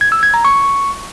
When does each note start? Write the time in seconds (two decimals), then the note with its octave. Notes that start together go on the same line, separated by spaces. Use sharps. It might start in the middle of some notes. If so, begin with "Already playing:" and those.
0.01 G#6
0.12 E6
0.23 G#6
0.34 A#5
0.45 C#6